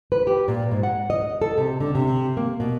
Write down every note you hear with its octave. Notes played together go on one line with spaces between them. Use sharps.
B4
G4
A#2
G#2
F#5
D#5
A4
C3
D3
C3
A#3
B2